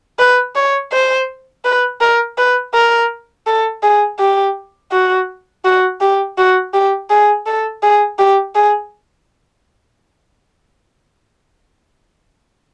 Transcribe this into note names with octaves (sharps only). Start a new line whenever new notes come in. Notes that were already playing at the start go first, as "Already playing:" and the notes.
B4
C#5
C5
B4
A#4
B4
A#4
A4
G#4
G4
F#4
F#4
G4
F#4
G4
G#4
A4
G#4
G4
G#4